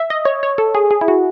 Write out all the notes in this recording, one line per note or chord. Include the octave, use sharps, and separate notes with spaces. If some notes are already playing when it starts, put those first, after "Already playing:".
Already playing: E5
D#5
C#5
C#5
A4
G#4
G#4
E4
F#4